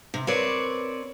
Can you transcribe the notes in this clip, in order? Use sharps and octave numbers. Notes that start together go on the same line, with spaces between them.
C3
C4 A#4 B4 C#5 D5